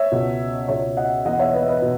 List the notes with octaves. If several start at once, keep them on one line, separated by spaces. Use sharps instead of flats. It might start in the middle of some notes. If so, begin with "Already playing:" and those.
Already playing: C#5 E5
C#2 B2
C#2 B2 C#5 E5
D#5 F#5
E2 B2 D#5 F#5
C#5 E5
B4 D#5
E5
B4 D#5
B2